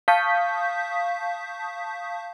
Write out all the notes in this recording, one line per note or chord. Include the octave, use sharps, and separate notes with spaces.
F5 A5 C#6 D#6 G6 B6